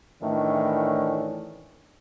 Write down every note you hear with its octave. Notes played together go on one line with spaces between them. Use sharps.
A2 D#3 E3 C#4 D4